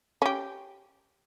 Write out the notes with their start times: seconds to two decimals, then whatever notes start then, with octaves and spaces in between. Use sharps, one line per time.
0.22 C#4 G4